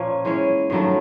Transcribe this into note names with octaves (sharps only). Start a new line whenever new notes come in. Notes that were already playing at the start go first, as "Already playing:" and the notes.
Already playing: A#2 F3 A#3 C#4
E3 G#3 C#4
G2 D#3 F#3 A3